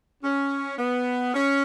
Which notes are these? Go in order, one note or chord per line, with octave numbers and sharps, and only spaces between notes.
C#4
B3
C#4